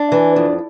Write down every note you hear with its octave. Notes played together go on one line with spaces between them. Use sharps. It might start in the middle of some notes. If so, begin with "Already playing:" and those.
Already playing: D4
E3
F2